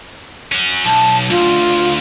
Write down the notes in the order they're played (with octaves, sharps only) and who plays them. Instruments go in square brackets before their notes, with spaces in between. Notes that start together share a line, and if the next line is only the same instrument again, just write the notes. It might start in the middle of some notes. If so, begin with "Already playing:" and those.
[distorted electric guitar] C#4 F#4
[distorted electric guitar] B1 [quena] A5
[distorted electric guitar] D2 [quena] F4